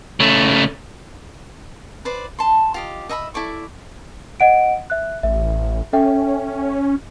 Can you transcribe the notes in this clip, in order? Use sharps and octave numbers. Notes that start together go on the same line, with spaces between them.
C#3 A3
B4 C5 D5
A5 C6
F4 G4 D#5
D#5 E5 A#5 B5
E4 A4 D5 C#6
D#5 F#5 D7
E5 F#6
A1 E5
C#4 A4 E5 G5